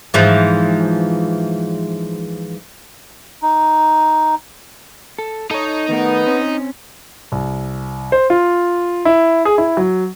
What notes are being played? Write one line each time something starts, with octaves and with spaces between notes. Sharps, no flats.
G#2 E3 F3
D#4
A4
D#4 A4 C#5
D#3 A3 B3 A#4
C4 C#4
C2
C5
F4
E4
G#4
E4
F#3